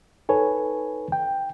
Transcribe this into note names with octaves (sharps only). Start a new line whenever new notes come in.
D#4 A4 B4 C#5 G#5
G5